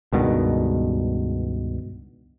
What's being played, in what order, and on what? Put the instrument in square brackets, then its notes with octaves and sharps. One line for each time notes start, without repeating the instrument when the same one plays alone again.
[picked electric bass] C#2 G2 B2 D#3